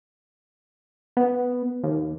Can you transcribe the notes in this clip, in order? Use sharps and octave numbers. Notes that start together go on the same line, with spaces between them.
B3
D#2